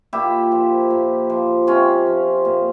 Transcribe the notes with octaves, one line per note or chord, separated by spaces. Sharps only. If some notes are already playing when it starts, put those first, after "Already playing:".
A#2 E4 G4
F3
A#2
F3
C3 C#4 F4
F3
A#2